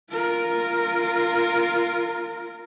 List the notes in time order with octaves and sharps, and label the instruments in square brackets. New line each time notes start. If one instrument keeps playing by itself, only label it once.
[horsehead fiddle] F4 A#4